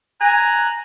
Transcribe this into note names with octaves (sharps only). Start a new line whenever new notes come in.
G#5 A#5 F#6